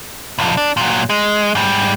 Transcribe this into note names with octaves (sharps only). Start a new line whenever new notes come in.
B1 F2
D4
A#2 F#3
G#3
G#2 G3